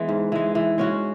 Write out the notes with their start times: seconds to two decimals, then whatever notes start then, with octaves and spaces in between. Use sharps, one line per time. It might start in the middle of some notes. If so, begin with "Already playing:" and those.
Already playing: E3 G#3 B3 E4
0.09 G#2
0.32 E3 G#3
0.55 E3
0.78 G#3 C#4 F#4